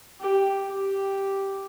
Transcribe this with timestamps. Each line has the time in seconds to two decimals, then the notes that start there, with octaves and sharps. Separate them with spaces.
0.21 G4
0.68 G4